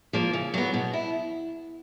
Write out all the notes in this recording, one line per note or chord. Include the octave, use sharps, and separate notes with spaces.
F3 A#3
C#3
F#3 B3
B2
E4